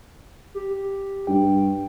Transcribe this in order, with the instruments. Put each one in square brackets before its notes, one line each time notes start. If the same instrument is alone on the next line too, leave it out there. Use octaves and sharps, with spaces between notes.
[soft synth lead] G4
[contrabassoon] G2 [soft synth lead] G5